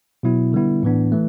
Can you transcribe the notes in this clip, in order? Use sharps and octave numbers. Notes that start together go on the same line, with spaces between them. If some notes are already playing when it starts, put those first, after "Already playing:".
B2 F#3 B3 E4
D3 G3 B3 E4
A2 E3 B3 D4
E3 A3